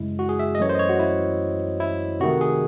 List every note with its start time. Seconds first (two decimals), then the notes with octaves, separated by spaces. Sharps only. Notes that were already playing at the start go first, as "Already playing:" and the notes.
Already playing: F#2 C#3 G#3 E4
0.19 F#4
0.29 G#4
0.39 E5
0.55 D#5
0.59 F#2 E3 A3 C#5
0.69 C5
0.75 D#5
0.79 C#5
0.89 F#4
1.00 E4
1.80 E4
2.20 C3 D#3 A3 F#4
2.41 G#4